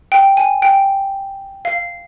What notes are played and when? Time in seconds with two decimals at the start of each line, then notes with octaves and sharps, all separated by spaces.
0.12 G5
0.37 G#5
0.62 G5
1.65 F5